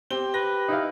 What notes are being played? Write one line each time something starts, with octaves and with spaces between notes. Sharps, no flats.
C4 G4 G7
B4 A#6
D#4 E4 F5